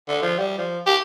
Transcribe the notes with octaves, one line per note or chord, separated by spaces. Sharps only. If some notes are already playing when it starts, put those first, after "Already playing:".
D3
F3
G3
F3
G4